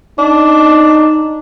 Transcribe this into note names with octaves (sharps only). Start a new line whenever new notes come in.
D4 D#4